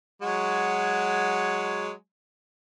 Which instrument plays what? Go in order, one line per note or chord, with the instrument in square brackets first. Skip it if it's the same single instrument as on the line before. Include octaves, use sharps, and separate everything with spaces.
[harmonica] F#3 G#3 F#4